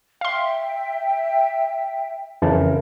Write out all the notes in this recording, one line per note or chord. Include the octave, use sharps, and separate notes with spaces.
E5 F5 G5 C6
F2 C#3 E3 A#4 A5